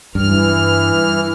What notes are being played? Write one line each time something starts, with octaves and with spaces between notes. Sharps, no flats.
G2 E3 F6